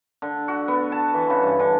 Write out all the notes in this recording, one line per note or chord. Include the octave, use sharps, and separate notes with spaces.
D3
F#4
B3
A5
E3
C#3
G2
D3